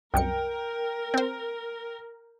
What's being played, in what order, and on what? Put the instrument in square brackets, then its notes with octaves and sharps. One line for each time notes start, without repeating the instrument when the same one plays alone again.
[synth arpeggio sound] C2 F#2 C#7 [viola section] A#4 [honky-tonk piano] G5
[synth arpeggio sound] C4 C5